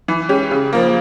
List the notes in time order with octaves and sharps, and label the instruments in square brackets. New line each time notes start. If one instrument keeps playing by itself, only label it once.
[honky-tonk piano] E3
G#3 C#4 G4
C#3
F3 A#3